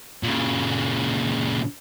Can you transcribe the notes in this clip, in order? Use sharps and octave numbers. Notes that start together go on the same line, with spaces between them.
A#2 C#3